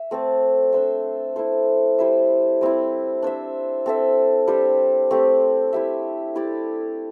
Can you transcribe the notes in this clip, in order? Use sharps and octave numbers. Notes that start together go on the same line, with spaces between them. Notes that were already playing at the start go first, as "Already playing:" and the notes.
Already playing: E5
A3 C4 A4
D4 C5 E5
E4 A4 C5
G3 E4 C5 E5
G3 C4 E4
D4 C5 E5
C4 A4 E5
G3 D4 G4 C5
A3 C4 G4
E4 G4 E5
E4 G4 D5